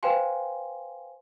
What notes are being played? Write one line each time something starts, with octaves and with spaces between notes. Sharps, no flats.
B4 C5 F5 G5 G#5 C6